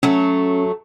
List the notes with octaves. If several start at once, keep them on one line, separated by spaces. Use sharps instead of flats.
F#3 A3 C#4